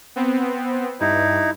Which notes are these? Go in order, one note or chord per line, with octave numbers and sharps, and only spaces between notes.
B3 C4
G2 D#4 E4